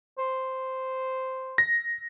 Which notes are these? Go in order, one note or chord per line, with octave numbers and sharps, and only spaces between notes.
C5
A#6